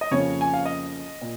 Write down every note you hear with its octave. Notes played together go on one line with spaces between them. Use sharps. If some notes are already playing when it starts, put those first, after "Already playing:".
D#5
F2 C#3 F3 A#3 C#5
G#5
F5
D#5
A#2